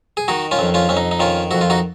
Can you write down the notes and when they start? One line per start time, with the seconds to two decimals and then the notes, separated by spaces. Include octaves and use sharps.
0.17 G#4
0.28 D#3 D#4 F#4
0.51 C#4 F4
0.59 F2
0.74 C#4 F4
0.89 F2 C#4
0.97 D#4
1.11 D#4
1.20 D#3 C#4 F4
1.51 F2 F#4
1.61 F4
1.70 D#4 F#4